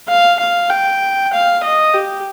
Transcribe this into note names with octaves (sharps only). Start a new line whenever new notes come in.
F5
F5
G5
F5
D#5
G4